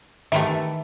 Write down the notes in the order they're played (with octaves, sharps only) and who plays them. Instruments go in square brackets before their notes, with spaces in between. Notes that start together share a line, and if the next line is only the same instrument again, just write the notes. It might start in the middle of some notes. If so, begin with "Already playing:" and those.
[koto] D#3 E3 A3 [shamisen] G4 E5